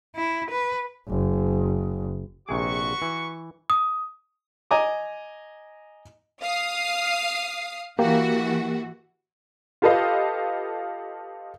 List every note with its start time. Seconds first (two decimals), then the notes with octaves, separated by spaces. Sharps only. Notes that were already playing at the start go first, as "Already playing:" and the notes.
0.16 E4
0.51 B4
1.08 F#1
2.49 A#1 C3 F#4 G#4 B4 C#6
3.02 E3
3.70 D#6
4.71 D#5 G#5 A#5 D6
6.42 F5 D#6 C7
7.99 E3 A#3 F#4 G4
9.82 F4 G4 A4 B4 D#5 F5